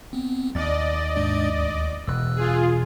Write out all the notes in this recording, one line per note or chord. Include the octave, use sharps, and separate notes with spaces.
B3 C4
D#2 D5 D#5 A6
G#2 G#3 D4
D2
E1 E6 F#6
F4 G#4